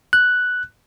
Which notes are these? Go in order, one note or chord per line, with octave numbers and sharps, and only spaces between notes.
F#6